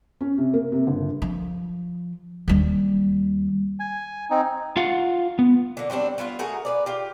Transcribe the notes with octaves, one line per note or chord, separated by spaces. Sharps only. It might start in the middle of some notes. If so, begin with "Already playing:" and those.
C#4
C3
A#3
C3
G1
F3
D#2 G3
G#5
C4 D#4
F4 F5 F#5
B3
D3 A#3
F#3 G3 C4 D4
F#3 B3 E4 F4
A3 F#4 G#4 A#4
B4 C#5 D5
F4 G4